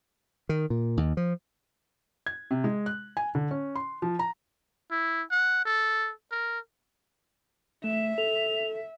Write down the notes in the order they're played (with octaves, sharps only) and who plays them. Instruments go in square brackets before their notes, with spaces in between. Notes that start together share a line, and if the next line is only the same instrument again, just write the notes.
[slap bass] D#3
A#2
D#2
F3
[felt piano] G#6
C3
G#3
F#6
G#5
D3
C#4
C6
F3
A#5
[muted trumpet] E4
F#5
A4
A#4
[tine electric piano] A3 [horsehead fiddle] E5 [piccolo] E7
[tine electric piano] A4 [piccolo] F7